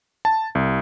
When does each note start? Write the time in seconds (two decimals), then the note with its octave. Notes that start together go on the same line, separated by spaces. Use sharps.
0.25 A5
0.55 C2